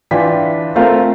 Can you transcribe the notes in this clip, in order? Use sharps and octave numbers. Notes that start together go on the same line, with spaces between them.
E3 D4 F4 G5 B6
A3 C4 F4 A#4 F5